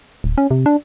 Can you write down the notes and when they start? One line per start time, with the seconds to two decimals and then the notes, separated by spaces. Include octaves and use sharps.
0.24 D1
0.38 C#4
0.51 C3
0.66 D4